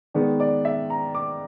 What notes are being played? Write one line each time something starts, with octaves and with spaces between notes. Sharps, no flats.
D#3 G#3 B3 D5
D5
E5
A#5
D6